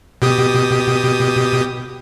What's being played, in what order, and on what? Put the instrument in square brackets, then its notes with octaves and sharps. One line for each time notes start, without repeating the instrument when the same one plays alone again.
[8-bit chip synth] B2 G4 D#6